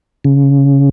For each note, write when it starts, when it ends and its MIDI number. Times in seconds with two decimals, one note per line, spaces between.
0.24 0.89 49